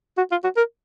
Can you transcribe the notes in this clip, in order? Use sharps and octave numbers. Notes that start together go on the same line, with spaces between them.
F#4
F4
F#4
A#4